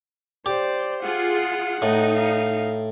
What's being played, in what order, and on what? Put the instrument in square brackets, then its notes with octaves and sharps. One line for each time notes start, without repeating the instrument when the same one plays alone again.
[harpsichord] G4 [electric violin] C5 D5
[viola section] F4 G#4 [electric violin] F#5
[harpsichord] A2 [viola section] D#4
[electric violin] F5